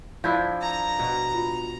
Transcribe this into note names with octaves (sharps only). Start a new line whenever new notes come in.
F3 D4 E4 F5 G6 G#6
A#5
B2
F4